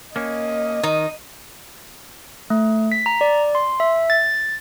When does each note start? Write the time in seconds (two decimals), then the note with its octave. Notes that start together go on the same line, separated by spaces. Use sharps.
0.16 A#3 C#4 D#5
0.84 D#3 D#4
2.50 A3
2.92 B6
3.06 A#5
3.21 D5
3.55 C6
3.80 E5
4.10 A6